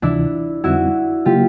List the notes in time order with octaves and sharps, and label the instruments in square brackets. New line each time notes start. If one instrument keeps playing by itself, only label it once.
[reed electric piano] D2 C3 E3 [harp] D4 E4
[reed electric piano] F2 D3 G3 C4 D#4 [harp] E4 F#4
[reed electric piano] C#3 F#3 A#3 [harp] F4 G4